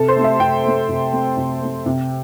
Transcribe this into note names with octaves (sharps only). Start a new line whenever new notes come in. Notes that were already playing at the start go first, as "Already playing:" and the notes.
Already playing: C3 A4
C5
A3 C4
E5
C3 G5
A3 C4
C3
A3 C4
C3
A3 C4
C3